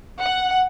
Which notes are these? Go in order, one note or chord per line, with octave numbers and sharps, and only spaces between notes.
F#5